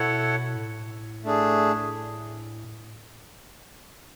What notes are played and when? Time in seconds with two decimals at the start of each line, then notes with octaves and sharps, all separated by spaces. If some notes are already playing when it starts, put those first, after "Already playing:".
Already playing: B2 E4 A4 C#5 F#5
0.56 A2
1.24 A3 D4 G#4